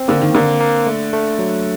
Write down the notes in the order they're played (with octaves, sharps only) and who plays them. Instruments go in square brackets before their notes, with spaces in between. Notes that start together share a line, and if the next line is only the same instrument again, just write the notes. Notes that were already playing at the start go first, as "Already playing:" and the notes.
Already playing: [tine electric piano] C4
[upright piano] D3 [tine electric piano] A#3
[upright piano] D#3
[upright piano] D3 [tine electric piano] A#3
[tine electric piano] A#3
A3
A3
F#3